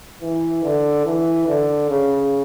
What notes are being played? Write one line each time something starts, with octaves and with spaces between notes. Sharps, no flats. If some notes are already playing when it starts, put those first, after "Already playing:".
E3
D3
E3
D3
C#3